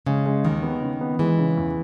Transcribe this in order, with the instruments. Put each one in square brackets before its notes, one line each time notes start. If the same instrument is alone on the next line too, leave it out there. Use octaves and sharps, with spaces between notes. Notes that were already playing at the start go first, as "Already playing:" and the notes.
[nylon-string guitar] C#3 [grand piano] G#3
[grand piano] G#3
[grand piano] D#2 [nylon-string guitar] D#3
[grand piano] B3
C#3
B3
[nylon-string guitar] E3 [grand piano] G#3
[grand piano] C#3
E2